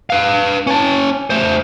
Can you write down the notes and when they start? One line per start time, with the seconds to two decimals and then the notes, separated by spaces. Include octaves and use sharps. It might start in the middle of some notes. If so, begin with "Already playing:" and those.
0.10 B4 F5
0.67 C#4 A5
1.30 A3 C5